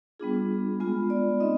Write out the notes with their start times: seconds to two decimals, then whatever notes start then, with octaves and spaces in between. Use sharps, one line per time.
0.19 G3 B3 D4 F4 G#4
0.80 G#3 B3 F4
1.10 D5
1.40 C4 D#4 D#5